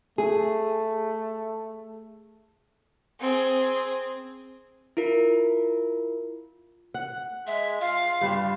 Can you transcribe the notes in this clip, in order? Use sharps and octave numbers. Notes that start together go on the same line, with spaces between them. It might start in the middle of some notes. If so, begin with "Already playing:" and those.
A3 G#4
C4 G#4
E4 F4 A#4
F#5
G#3 E5
F4 F5
G2 G3 D4 F4